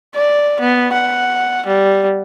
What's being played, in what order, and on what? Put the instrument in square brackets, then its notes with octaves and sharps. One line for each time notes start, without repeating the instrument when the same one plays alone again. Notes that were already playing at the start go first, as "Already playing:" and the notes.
[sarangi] D5
B3
F#5
G3